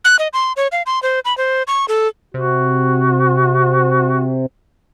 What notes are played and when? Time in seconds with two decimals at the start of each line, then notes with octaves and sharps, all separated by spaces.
0.05 F#6
0.19 D#5
0.33 C6
0.57 C#5
0.72 F5
0.86 C6
1.03 C5
1.25 B5
1.38 C5
1.67 C#6
1.88 A4
2.34 C3 F#4